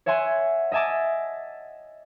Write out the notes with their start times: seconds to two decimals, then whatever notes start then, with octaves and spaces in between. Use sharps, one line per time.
0.06 C#5 E5 F#5 G#5 C6
0.72 D#5 E5 G#5 A5 D6